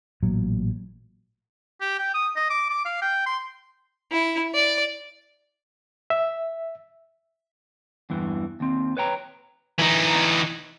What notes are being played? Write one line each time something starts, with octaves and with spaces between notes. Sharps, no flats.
A1 A#2 F#3
G4
G5
D#6
D#5
D6
D6
F5
G5
C6
E4
D5
E5
E2 G2 E3
D#2 C4
B4 C#5 G5 A#5
E3 D#4